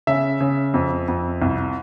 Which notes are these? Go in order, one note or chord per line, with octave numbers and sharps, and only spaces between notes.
C#3 E5
C#3
F2
F2
C2